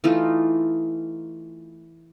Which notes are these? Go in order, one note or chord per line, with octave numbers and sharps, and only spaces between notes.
E3 A3 D#4 F4